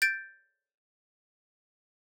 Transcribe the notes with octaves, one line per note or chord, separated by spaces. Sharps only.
G6 A6 D7